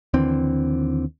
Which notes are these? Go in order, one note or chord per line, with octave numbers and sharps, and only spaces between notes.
D#2 D3 E3 C4